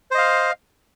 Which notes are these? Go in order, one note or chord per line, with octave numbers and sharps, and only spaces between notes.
C5 D#5 F5